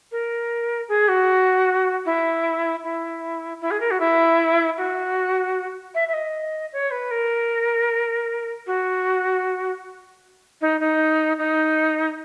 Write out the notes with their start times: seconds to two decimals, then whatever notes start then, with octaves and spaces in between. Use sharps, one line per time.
0.11 A#4
0.88 G#4
1.08 F#4
2.06 E4
2.83 E4
3.61 E4
3.71 G#4
3.80 A#4
3.91 F#4
4.00 E4
4.77 F#4
5.95 E5
6.08 E5
6.13 D#5
6.73 C#5
6.91 B4
7.11 A#4
8.67 F#4
10.61 D#4
10.80 D#4
11.38 D#4